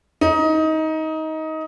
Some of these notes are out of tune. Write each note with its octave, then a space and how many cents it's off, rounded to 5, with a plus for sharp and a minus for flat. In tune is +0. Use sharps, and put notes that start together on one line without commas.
D#4 +20